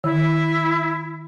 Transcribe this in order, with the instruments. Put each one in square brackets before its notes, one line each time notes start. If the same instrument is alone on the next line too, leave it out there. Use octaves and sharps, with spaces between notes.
[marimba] D#3 [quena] E4